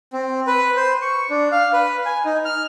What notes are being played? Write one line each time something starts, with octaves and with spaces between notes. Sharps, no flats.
C4
B4
C5
C#6
D4
F5
B4
G#5
D#4
F6